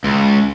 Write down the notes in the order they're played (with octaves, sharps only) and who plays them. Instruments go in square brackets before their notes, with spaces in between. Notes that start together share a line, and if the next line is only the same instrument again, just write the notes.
[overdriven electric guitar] C#2